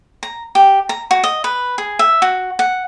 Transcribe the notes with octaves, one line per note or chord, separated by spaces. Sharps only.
A#5
G4
A#5
F#4
D#5
B4
G#4
E5
F#4
F#5